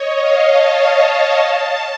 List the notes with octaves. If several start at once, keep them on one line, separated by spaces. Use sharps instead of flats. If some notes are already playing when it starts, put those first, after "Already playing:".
Already playing: C#5 D#5
F5
A5
A5